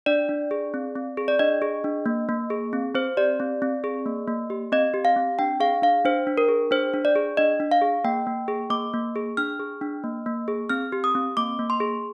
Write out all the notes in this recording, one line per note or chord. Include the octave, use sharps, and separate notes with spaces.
D4 D5
D4
G#4
C4
C4
G#4
D5
D4 D#5
G#4
D4
A#3
A#3
G#4
C4
C4 C5
G4 D5
C4
C4
G#4
A#3
A#3
G4
C4 D#5
G4
F5
C4
D4 G5
G#4 F5
D4 F5
D4 C5
D4
A#4
G#4
D4 C5
D4
D5
G#4
D4 D#5
D4
F5
G#4
A#3 G5
A#3
G#4
A#3 D6
A#3
G#4
D4 F6
G#4
D4
A#3
A#3
G#4
C4 F6
G4
D#6
C4
A#3 D6
A#3
C6
G#4